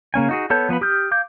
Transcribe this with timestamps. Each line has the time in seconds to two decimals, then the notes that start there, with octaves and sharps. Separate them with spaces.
0.14 C#3 A#3 C#4 G#5
0.29 D#4 F#4 G#4
0.50 B3 A4 C#5 A5 G6
0.69 F3 B3 B4 B5
0.81 G4 D#6 F6 G6
1.11 F5 D6 G6